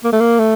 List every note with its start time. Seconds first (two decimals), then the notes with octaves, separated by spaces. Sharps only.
0.04 A#3
0.13 A3
0.20 A#3
0.39 A3